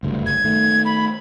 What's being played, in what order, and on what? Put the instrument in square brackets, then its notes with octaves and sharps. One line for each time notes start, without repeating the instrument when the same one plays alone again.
[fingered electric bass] F#1 D2 G2
[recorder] G#6
[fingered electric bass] D#3 A3
[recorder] B5